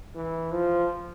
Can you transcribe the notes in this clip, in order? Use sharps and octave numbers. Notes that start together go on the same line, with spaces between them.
E3
F3